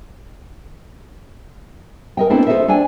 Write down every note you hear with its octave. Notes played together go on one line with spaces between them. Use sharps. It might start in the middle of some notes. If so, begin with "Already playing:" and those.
A#4 D#5 G5
A3 B3 C4 D4 E4 A4
F4 A4 A#4 C5 D#5 E5
D4 D5 G5 G#5